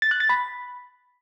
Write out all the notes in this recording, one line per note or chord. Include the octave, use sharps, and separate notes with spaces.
A6
F#6
A6
B5